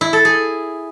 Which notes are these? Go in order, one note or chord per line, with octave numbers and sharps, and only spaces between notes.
E4
A4
G#4